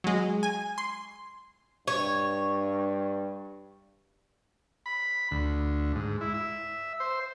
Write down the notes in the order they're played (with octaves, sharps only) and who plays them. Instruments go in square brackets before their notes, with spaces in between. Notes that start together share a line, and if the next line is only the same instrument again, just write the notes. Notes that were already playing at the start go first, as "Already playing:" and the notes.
[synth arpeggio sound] F#3 G#3
G#5
C6
[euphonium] G2 [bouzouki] C#5
[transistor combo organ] B5
D2
G#2
E4
E5
C5